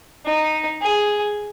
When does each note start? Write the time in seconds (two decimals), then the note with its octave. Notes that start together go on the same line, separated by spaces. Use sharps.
0.26 D#4
0.82 G#4